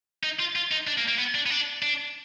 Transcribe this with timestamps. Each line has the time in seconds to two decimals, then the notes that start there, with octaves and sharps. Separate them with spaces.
0.24 D#4
0.39 F4
0.56 F4
0.72 D#4
0.87 D4
0.98 A#3
1.08 A#3
1.18 B3
1.35 D4
1.46 B3
1.50 D4
1.82 D4